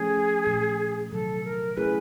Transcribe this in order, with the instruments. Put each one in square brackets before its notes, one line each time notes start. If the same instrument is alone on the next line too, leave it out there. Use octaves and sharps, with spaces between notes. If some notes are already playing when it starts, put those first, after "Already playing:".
Already playing: [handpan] F3 A3 C#4 [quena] G#4
[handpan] A#2 F3 A3
[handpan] C3 D#3 F#3 [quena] A4
[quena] A#4
[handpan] A3 C#4 E4 G#4 [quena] B4